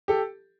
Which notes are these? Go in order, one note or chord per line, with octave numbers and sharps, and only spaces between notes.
G4 A4